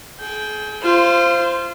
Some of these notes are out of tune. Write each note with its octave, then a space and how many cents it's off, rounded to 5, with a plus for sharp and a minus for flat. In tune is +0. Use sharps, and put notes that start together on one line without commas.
G#4 +35 G5 +0
F4 -25 C5 +0